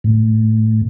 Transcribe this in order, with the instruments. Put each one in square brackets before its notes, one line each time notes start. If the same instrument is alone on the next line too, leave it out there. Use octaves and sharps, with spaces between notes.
[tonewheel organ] A2